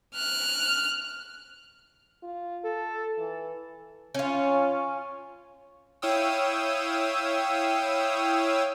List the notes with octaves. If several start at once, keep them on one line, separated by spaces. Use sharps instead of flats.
F6 F#6
F4
A4
E3
C#4 F4
E4 C#5 F5 G5 D#6 E6